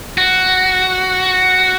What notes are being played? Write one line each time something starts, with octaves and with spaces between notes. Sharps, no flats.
F#4